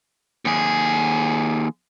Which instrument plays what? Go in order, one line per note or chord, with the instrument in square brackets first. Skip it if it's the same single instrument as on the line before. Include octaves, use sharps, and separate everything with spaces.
[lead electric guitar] D#2 G#4